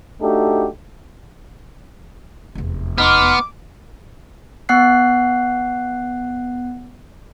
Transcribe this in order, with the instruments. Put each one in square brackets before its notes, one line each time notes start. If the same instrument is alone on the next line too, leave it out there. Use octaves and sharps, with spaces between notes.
[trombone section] A3 D4 D#4 F#4 G4 A4
[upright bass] F1 E2
[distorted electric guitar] B3 [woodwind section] D#4 C6 F6 [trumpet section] D6
[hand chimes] B3 F#5 F#6 C7